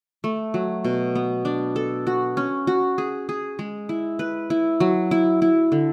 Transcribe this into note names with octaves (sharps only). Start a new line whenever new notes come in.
A3
F#3
B2
B3
D4
A4
F#4
C#4
F#4
G#4
G#4
G#3
E4
B4
E4
F#3
E4
E4
D3